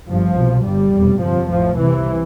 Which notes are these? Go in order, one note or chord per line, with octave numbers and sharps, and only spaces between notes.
G1 G2 F3
C2 B2
G1 G2 G3
F1 E2 B2
G1 F2 C3 F3
A1 A2 F3
C2 C3 E3